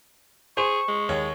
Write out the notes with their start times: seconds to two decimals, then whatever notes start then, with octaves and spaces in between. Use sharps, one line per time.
0.57 G#4 C5 G#5 C#6
0.88 G#3
1.09 D#2 C#5